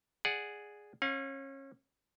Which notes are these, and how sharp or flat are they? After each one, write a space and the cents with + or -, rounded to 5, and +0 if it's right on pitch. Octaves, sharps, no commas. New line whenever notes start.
G#4 +0 D5 +0 F#5 +0
C#4 -30 F5 +35